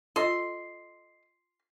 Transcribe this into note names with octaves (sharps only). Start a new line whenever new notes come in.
F4 A4 D#5 C6